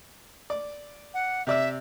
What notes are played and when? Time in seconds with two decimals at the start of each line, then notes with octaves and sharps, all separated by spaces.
0.50 D5
1.14 F#5
1.47 C3 D5 E5 E6